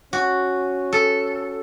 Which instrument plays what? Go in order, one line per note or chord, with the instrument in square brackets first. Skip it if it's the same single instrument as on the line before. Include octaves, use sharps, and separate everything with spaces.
[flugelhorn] C#4 [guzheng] F#4
[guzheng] A4